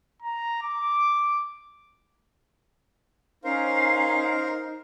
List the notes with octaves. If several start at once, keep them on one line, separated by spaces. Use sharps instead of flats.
A#5
D6
C#4 D#4 A#4 C5 F5